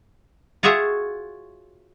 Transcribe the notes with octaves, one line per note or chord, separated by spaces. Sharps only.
F4 F#4 G#4 C#5 E5 F#5